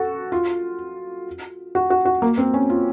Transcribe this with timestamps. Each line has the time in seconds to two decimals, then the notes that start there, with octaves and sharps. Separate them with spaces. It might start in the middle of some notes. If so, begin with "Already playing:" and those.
Already playing: F#4 A4
0.32 F4
1.75 F#4
1.90 F#4
2.05 F#4
2.22 A#3
2.38 C4
2.54 C#4
2.70 F4